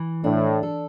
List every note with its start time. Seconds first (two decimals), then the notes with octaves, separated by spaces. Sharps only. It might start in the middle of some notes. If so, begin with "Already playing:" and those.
Already playing: E3
0.24 A2 D4
0.63 A4